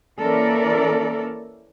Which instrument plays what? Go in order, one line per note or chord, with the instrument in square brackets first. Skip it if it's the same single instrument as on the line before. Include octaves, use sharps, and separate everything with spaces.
[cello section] E3 A#3 C#4 A4 A#4 D5